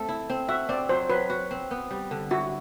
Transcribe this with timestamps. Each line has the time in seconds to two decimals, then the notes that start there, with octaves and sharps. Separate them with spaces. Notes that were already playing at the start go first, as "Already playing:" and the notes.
Already playing: A3 C4 A4
0.09 E4
0.30 C4
0.49 F#4 E5
0.69 C4 D5
0.89 F#3 C5
1.10 F#3 B4
1.30 F#4
1.51 C4
1.71 B3
1.91 G3
2.11 D3
2.31 E4 F#4